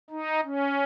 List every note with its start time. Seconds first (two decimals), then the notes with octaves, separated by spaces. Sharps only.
0.10 D#4
0.44 C#4